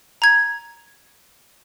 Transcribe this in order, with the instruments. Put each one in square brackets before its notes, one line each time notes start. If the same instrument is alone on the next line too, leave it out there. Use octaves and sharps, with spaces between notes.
[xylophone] A#5 G#6